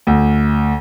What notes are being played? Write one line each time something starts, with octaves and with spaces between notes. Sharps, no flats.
D2